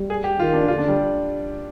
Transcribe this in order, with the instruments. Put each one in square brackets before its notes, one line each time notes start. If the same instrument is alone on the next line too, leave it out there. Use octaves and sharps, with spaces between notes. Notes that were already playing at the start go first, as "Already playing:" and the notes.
Already playing: [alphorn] G3
[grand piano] G#4
G4
[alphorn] D#3 [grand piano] F4
[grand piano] D4
[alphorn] D3 [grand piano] F4
[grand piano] D4
G3